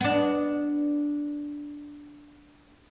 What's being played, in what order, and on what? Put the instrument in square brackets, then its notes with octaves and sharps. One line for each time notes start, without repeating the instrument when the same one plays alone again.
[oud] B3 D4